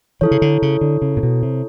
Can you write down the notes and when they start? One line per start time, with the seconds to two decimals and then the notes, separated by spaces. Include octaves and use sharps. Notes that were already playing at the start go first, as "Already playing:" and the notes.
0.21 E3 E4 A4 C#5
0.31 C#3
0.42 D3
0.62 C#3
0.81 D3
1.02 C#3
1.17 A#2
1.23 B2
1.43 C3